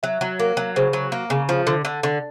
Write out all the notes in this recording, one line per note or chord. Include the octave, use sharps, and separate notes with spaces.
F#3 E5
F#3
A#3 A#4
F#3
C#3 C5
F#3
A#3
C#3
F3
D3
D3
D3